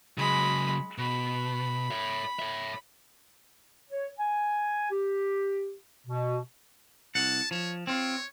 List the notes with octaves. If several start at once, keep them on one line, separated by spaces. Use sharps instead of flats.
C#3 F#3 G#3 B5
B2 B5
C#5 E5
C#5 E5
C#5
G#5
G4
B2
C2 F#5 A5
F3 C#5
C4 F4 C#5